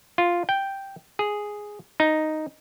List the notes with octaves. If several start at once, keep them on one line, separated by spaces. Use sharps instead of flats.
F4
G5
G#4
D#4